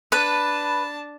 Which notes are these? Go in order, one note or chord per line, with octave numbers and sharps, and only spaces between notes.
D4 B4 A5